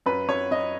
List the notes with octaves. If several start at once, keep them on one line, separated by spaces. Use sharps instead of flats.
F#2 B4
F#2 C#5
F#2 D#5